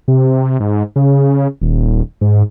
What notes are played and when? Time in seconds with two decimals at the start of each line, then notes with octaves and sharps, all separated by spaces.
0.08 C3
0.60 G#2
0.96 C#3
1.62 D#1
2.21 G#2